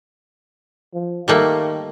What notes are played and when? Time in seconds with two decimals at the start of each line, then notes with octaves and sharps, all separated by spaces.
0.94 F3
1.28 D#3 G3 A3 A#3